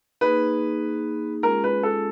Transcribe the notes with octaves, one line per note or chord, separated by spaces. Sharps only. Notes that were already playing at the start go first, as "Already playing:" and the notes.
A#3 D#4 G#4 B4
G#3 C#4 F4 G#4 A#4
B4
A4